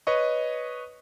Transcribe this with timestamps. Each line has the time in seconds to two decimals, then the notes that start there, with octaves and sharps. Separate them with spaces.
0.07 B4 C#5 D#5 C#6